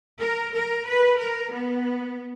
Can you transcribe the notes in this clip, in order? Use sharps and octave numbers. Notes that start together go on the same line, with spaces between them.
A#4
A#4
B4
A#4
B3